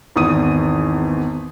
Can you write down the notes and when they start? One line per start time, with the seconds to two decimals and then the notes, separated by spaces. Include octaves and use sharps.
0.16 G#1 E2 D#6 D#7